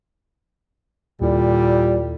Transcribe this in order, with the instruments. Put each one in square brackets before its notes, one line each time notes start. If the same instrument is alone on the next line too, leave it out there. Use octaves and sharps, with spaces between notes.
[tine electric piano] D#2 E4 A4 [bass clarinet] A#2 [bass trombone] G3